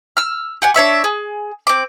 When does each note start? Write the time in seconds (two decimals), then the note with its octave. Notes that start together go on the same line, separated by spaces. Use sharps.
0.17 E6 F6
0.62 G4 F#5 G#5
0.74 D4 C#5 E5 C#6
1.04 G#4
1.67 C4 D6